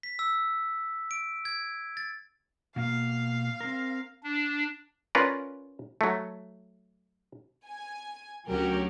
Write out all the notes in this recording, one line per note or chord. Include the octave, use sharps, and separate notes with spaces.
B6
E6
D7
G#6
A6
B2 A#3 F5
C4 A#4
D4
C#4 F4 A#4 B4 D5
F#3 A3
G#5
D2 F#3 C#4 F#4 G4 A#4